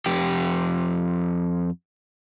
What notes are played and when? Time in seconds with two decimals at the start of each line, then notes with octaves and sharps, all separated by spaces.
0.06 F2 G4